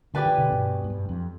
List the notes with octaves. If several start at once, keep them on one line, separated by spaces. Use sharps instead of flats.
D3 G4 B4 D5 G#5
D#3
B2 D3
G2 B2
G#2
G2
F2